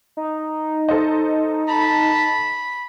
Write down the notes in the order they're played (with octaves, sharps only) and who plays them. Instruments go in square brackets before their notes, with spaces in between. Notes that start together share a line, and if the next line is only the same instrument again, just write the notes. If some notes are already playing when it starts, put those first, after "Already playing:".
[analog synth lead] D#4
[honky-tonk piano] A4 C5 D#5
[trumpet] A5 [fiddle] B5